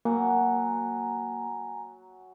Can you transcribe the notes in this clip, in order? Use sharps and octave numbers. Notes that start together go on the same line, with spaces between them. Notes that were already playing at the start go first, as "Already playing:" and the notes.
F#3 A#3 F#5 G#5 A#5